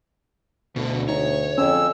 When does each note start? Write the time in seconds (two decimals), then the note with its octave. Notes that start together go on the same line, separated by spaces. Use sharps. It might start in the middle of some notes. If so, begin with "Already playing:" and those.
0.76 D2 B2 D3
1.09 D#4 C#5
1.58 F2 C#4 E6